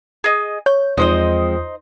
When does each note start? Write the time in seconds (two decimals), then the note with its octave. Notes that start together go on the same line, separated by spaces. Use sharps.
0.24 G#4 D#5
0.66 C#5 G6
0.97 E2 F3 G#3 C4 D#4 C5 D#5